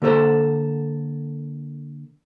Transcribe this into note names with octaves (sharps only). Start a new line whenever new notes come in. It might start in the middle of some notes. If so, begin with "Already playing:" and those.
D3 A#3 A4 C5